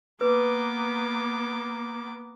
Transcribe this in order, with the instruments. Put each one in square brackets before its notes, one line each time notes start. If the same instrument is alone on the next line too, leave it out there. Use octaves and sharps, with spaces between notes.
[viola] A#3 B3 [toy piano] B4 [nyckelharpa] D6